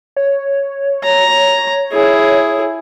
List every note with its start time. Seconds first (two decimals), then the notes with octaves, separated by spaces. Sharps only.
0.17 C#5
1.04 A#5
1.92 E4 G#4